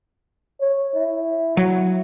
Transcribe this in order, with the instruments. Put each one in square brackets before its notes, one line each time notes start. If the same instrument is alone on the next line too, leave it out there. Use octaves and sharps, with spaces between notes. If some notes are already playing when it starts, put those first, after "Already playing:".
[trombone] C#5
E4
[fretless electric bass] F#3